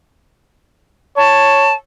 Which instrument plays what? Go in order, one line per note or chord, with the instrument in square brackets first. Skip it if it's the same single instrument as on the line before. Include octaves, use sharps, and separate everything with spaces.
[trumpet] C#5 [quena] A5